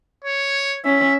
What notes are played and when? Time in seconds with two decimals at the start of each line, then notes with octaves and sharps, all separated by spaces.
0.24 C#5
0.85 C#4 E5